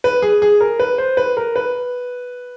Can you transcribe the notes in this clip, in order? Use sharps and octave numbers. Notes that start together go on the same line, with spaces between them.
B4
G#4
G#4
A#4
B4
C5
B4
A#4
B4